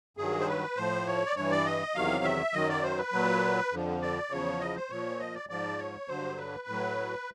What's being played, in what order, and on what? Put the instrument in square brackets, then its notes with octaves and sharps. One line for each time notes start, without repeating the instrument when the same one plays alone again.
[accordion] G2 D#3 F#3 G#4
C5
B4
A2 F3 C5
C#5
D5
G2 E3 C#5
D5
D#5
E2 C3 D#3 F#3 F5
E5
F#2 D#3 F#3 D#5
D5
C5
B4
A#2 F#3
F2 D3 F3
D5
E2 C#3 F3 C#5
D#5
C5
A#2 F3 C#5
D#5
D5
G#2 F3 D5
C#5
G2 D3 F#3 C5
B4
A2 F#3